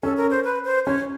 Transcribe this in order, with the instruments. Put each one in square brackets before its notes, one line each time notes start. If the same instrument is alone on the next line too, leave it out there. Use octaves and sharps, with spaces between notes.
[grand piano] C#4 [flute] A4
[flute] A#4
C5
B4
C5
[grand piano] C#4 [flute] C#5